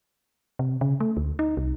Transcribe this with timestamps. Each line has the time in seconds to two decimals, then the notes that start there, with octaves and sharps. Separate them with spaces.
0.59 C3
0.81 C#3
1.00 A3
1.17 D2
1.39 D#4
1.57 C2